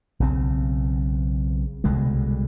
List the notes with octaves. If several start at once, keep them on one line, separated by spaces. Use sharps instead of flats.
B1 C#3 C4
C2 B2 D3 G#3